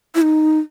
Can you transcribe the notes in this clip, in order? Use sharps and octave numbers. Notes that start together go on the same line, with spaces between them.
E4
D#4